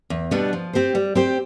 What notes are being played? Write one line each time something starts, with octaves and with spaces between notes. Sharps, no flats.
E2
B2 G3 B3 D4
F3
C4 G4 C5
G3
C4 G4 C5